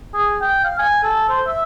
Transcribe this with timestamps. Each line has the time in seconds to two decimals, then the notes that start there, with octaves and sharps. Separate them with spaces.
0.14 G#4
0.41 G5
0.64 F5
0.78 G#5
1.03 A4
1.29 C5
1.47 E5